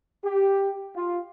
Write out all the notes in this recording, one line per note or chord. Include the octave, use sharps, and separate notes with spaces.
G4
F4